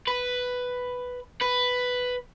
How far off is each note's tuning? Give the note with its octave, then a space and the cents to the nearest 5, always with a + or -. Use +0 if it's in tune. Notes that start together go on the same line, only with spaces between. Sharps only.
B4 +5
B4 +5